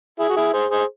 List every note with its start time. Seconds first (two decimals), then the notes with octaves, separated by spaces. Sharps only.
0.19 E4 G#4
0.29 F#4
0.36 E4 G#4
0.53 G#4 C5
0.71 G#4 C5